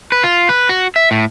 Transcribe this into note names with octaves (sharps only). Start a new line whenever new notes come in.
B4
F4
B4
F#4
E5
A2